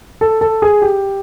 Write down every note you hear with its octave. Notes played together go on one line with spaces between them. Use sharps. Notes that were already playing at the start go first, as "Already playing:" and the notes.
A4
A4
G#4
G4